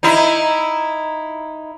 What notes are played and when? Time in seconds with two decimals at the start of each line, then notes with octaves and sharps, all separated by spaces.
0.03 D#4 E4